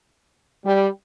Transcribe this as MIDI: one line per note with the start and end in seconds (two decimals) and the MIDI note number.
0.65 0.89 55